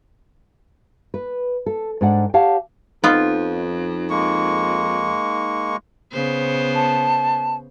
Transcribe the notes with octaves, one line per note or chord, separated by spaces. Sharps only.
B4
A4
G#2 D4 D5 F#5
G4 C#5 F5 F#5 A5
F2 B3 D#4 F4
G#3 A#3 C#6
C#3 B3 C5
A5